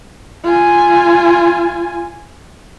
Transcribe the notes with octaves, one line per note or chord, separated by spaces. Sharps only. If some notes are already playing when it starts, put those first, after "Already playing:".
F4 G#5